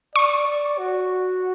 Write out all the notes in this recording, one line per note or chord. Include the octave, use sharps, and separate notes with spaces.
D5 C#6
D5
F#4